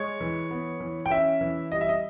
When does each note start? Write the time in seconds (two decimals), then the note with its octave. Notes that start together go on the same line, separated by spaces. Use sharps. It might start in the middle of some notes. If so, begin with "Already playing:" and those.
Already playing: G#3 C#5
0.20 E3
0.51 B3
0.80 E3
1.06 G5
1.10 C#4 E5
1.41 E3
1.72 G3 D#5
1.81 E5
1.89 D#5